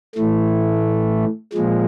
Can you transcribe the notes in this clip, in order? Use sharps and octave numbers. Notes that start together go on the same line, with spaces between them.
A2 E3 A3
A#2 F3 G#3